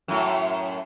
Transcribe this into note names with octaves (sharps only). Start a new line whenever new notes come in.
F#2 A2